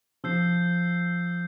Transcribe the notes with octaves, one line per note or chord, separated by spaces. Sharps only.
F3 E6 G6 C7